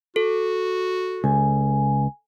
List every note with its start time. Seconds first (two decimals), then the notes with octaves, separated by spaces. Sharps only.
0.16 F#4 A4
1.24 C#2 G#5